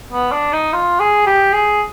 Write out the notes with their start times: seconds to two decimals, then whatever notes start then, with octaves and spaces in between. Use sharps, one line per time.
0.12 B3
0.32 D4
0.53 D#4
0.73 F4
1.00 G#4
1.26 G4
1.53 G#4